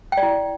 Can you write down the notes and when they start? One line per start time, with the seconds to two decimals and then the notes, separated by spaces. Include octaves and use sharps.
0.12 G5
0.17 D5
0.23 E4